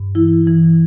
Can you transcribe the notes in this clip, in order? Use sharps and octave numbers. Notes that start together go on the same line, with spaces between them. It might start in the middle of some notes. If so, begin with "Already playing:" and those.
Already playing: G2
E3 E4
E3